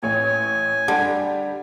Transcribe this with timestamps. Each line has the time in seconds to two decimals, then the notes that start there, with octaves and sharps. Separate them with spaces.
0.03 A1 C#5 G#5
0.88 D3 G3